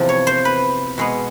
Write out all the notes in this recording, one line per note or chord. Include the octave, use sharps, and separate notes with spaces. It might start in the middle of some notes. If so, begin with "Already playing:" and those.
Already playing: E2 C3 F3
C#5
C5
B4
B2 G#3 B3